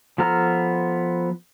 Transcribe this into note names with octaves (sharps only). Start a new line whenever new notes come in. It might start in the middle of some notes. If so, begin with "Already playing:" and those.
F3 B3 A4 A#5 F6